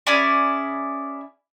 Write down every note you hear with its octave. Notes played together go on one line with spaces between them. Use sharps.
C#4 E4 G#4 D5